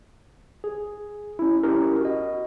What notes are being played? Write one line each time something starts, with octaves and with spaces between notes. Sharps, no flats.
G#4
C#4 E4
C#4 E4 G4 A#4
F#4 D#5